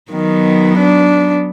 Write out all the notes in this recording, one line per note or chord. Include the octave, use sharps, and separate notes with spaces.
D#3 F#3 B3
D4